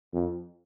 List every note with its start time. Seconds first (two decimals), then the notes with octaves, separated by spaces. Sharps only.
0.13 F2